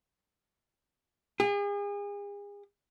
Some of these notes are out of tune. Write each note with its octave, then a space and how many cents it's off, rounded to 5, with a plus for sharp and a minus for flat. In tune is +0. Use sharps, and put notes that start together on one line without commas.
G#4 -40